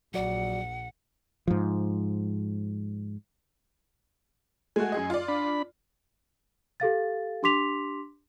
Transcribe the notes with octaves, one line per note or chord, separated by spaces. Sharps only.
A#1 F#3 F#4 D5 F#5
G#2 F3
G#3 A3 F#4 G#5
F#2 G#4 D#5
F4 D5
D4 B5
G4 A4 F5 A6
D4 G4 C6 D6 B6 F7